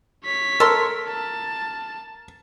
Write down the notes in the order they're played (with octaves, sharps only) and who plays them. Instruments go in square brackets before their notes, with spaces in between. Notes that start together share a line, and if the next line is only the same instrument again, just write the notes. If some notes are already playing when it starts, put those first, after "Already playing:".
[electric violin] C#5 B6
[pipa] A4 C6 [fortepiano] A#4
[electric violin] A5